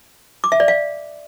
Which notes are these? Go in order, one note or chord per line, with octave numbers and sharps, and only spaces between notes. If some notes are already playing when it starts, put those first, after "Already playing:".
D6
E5
D5
F5